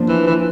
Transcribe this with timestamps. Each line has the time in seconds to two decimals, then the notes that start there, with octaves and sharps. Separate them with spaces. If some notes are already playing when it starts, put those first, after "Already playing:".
Already playing: F3 A#3 D4
0.08 E3
0.27 E3